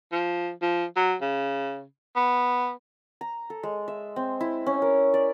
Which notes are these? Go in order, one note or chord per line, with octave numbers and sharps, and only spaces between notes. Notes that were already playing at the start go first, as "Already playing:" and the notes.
F3
F3
F#3
C#3
B3
A#5
A4
G#3
E5
C4
E4
C#4
A#4
D5